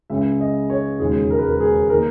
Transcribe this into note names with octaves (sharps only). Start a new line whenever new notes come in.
C#2 C#3 G#3 C#4 E5
D#5
C#5
E1 D#2 C#3 G#3 G#4
A#4
B4
A#4
G#4
D#3 A#3 D#4 A#4